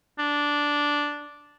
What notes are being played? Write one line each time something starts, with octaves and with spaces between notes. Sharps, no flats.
D4